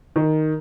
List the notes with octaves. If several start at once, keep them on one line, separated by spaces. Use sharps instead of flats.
D#3